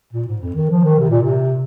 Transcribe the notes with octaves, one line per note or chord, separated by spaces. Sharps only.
A#2
G#2
F2
D#3
F3
D#3
C3
A#2
C3